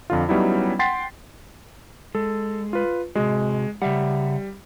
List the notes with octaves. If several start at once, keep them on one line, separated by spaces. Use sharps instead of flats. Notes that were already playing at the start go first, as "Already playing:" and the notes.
F2 D3 F4
F#3 G3 B3 C#4 D#4 E4
F#5 G5 C6 A6 B6 C7
G#3 A4
F4 B4
C3 G#3 F#4
C#3 G3 E5 F#5